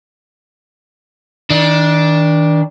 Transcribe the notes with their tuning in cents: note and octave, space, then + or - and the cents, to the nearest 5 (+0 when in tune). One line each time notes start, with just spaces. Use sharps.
D#3 +35 D4 +0